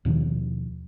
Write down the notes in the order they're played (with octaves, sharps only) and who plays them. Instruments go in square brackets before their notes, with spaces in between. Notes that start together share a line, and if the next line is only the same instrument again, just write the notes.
[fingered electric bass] D#2 B2 D#3 F3